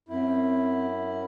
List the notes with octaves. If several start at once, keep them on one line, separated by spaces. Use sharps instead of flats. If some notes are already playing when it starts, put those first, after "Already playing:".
F#2 C4 E4